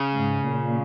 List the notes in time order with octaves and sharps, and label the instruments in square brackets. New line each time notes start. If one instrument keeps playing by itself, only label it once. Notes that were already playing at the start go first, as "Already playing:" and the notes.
Already playing: [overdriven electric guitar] C#3
[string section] G#2
A#2